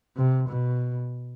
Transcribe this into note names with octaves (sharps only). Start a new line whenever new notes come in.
C3
B2